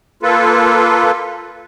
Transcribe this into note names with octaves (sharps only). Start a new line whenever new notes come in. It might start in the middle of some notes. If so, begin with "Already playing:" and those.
A#3 F4 A4 B4